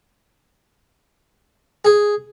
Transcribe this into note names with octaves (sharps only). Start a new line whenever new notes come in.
G#4